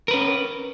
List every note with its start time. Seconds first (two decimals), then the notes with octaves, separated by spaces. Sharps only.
0.08 A#4
0.11 B4
0.14 C#4